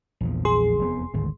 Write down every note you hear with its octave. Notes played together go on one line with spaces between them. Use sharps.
A#1 E2 F3
G#4 C6
F1 E2 B3
G#1 D2 A2